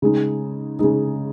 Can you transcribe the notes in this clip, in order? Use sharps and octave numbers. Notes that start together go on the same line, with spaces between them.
C#3 G#3 D#4
C#3 G#3 D#4